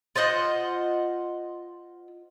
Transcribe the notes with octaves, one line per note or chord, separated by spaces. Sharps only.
F4 C5 D#5 F#5